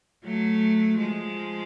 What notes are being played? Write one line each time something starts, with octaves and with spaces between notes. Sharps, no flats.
F#3 A3
F3 G#3